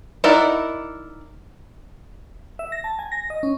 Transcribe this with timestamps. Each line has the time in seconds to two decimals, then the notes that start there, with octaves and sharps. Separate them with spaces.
0.24 D#4 E4 A#4 D5 F#5
2.59 E5
2.72 A#6
2.84 A5
2.99 G#5
3.12 A#6
3.30 D#5
3.43 C#4